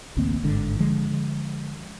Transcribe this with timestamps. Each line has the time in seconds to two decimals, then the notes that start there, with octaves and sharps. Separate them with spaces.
0.17 A1 D2 A#3 C4
0.43 G1 G#2 D3
0.79 D3 F3 G#3